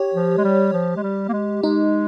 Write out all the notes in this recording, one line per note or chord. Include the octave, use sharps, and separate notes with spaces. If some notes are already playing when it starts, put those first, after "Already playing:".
Already playing: G4 C#5
F3
G#3
G3
F3
G#3
G3
A#3
G#3
G#3 D#4